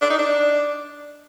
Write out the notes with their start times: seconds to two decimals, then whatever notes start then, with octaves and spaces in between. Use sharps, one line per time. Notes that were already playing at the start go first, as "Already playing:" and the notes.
0.01 D4
0.10 D#4
0.19 D4